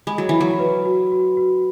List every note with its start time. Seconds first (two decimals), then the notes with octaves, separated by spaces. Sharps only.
0.07 G#3 B5
0.18 F#3
0.29 E3 B5
0.41 F#3
0.59 B4
0.85 F#4
1.12 F#4
1.37 F#4